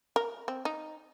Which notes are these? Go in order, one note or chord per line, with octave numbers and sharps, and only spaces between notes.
A#4
C4
D#4